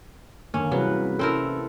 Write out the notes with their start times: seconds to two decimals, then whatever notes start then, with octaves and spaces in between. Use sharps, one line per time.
0.54 F#2 D3 D#3 A#3 C#4
0.72 C3 E3 F#3 G3 C4 G#4 B4
1.19 C4 C#4 E4 A4 A#4